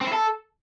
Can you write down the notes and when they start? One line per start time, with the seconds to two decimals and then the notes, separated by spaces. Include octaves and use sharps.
0.01 C4
0.07 E4
0.13 A4